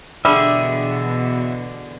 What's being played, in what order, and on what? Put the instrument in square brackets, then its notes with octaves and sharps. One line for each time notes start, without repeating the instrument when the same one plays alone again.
[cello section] B2 E3 [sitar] D3 D4 G#4 [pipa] G3 [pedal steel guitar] E5